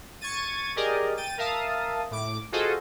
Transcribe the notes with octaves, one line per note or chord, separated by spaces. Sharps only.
C#6 G#6 A6 D#7
G4 G#4 A#4 D5 D#5
G5 A6 D#7
A#4 E5 F5 A5 D#6
A2 D6
F4 F#4 G#4 A4 C5 D#5